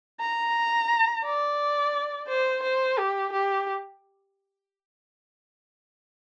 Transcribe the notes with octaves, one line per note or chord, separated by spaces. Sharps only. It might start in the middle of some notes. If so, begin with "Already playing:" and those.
A#5
D5
C5
C5
G4
G4